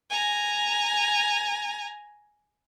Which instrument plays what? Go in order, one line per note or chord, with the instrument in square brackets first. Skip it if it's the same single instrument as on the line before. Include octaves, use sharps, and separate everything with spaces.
[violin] G#5 A#5